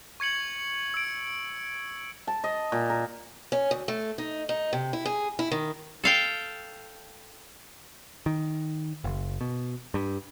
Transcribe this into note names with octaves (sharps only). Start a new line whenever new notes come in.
C#6 G#6 C#7 F#7
E6 D7
A5
D#5
A#2
A#4
C#4
D2
A3
D#4
D#4
C3
E4
G#4
E4
D#3
A4 F5 G5
D#3
F#1
B2
G2